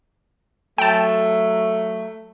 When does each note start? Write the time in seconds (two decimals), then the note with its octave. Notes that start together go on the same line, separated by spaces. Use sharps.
0.78 F#3 A3 G5 A5